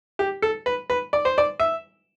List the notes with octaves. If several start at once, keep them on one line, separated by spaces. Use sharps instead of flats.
G4
A4
B4
B4
D5
C5
D5
E5